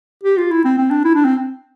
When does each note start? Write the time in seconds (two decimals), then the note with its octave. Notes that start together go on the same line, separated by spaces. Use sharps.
0.23 G4
0.37 F4
0.51 E4
0.65 C4
0.78 C4
0.91 D4
1.05 E4
1.15 D4
1.25 C4